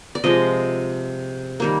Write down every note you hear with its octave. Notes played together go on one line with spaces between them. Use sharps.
D5
C3 F3 G#3 D#5
D#3 G3 A#3